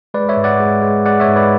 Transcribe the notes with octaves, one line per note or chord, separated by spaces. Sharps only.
G#3 B4 D5
C#5 E5
G#2
D5 F#5
G#3
G#3
G#3 D5 F#5
C#5 E5
G#2
B4 D5